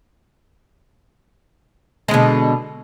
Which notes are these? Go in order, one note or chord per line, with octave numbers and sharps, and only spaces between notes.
B2 D3 G#3